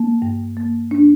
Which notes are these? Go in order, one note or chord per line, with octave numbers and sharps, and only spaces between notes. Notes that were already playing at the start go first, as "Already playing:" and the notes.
Already playing: A#3
G2
A#3
D4